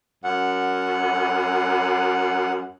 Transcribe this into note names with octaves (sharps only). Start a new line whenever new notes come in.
F#2 F#5